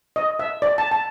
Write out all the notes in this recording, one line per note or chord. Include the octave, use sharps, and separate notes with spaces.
D#5
E5
D5
A5
A5